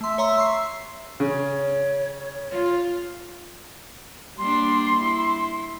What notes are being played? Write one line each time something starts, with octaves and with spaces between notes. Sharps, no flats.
A3 E5 C6
C#5 A#5 C6
C6 C#6 C7
C#3 C#5
F4
G3 A#3 D4 C6
E4